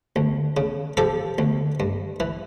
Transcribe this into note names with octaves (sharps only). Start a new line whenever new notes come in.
D2
C#3
F3 G4 A4
D2
G2
E3